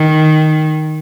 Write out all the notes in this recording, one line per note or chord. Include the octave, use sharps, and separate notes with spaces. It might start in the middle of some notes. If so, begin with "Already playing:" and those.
Already playing: D#3